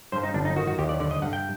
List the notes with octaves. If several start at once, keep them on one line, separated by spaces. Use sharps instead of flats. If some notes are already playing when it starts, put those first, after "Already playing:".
G2 C5
D#4
G1 D4
D#4
D#3 F#4
F#4
D#2 G4
D5
D3 D5
D#5
G2 F#5
G5